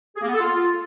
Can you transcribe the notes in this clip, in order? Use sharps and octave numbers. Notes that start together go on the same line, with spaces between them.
G#4
A#3
B3
A4
F4